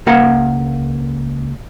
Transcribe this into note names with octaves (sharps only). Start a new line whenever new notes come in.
C#2 A#3 A#4 F5 F#5